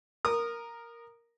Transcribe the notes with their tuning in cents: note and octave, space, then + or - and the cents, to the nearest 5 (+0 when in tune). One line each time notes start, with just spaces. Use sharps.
A#4 +0 D#6 -20